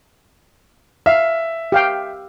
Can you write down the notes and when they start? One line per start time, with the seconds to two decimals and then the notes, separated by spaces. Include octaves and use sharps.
1.06 E5 F5
1.72 G4 F5 G5